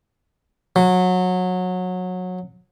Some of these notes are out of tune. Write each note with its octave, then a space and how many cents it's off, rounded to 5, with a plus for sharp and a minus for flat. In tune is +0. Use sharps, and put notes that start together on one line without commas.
F#3 -20